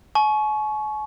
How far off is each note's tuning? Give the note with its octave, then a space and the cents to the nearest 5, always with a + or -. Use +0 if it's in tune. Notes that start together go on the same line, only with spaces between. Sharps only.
G#5 +45 C#6 +0